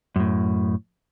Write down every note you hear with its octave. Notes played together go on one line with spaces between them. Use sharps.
F#2 A2